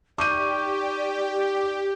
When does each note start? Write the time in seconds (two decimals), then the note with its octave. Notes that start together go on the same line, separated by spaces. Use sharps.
0.18 D#4 G4 D5 C#6 D6 G6 D#7